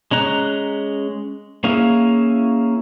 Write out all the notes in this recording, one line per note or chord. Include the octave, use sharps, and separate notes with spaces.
G#3 C#4 A#5 F#6
A#3 C#4 E4 G#4 F5